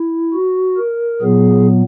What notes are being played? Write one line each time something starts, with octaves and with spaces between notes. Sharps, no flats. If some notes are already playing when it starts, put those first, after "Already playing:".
Already playing: E4
F#4
A#4
A#2 F#3 B3 G#4